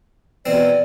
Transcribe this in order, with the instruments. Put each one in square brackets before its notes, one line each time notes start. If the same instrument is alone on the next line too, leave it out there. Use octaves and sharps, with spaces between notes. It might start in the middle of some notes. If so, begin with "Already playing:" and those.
[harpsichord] B2 E3 C4 [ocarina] D5